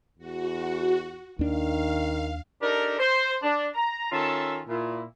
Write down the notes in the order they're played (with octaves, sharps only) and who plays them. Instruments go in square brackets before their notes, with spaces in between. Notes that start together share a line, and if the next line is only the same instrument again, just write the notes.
[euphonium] E2 [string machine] F#4
[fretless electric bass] D#2 D4 [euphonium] D#3 [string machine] F5
[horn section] D4 D#4 G4 A4 A#4
C5
D4
A#5
D#3 C#4 F4 A4 E5 A5
A#2 E4